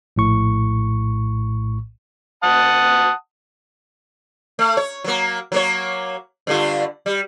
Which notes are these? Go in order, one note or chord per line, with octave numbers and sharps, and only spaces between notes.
A#1 A2 C#6
F#5 A5 D#6
A3
C#5
F#3 A#3
F#3 A#3 C#5
G2 D3 F4
G3